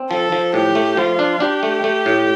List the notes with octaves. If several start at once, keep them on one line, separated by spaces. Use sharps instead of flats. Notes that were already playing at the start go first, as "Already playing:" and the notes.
Already playing: C4
F3 A4
F3
A2 G4
A3
F3 F4
D4
D4 G4
A3
A3
A2